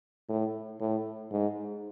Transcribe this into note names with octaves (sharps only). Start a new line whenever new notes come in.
A2
A2
G#2